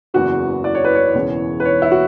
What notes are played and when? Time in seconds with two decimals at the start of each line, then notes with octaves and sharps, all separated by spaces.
0.14 F#1 E2 C#3 E3 F#4
0.64 D5
0.75 C#5
0.84 B4
0.95 C#5
1.14 E1 E2 C#3 E3
1.60 B4
1.65 C#5
1.82 E4
1.91 F#4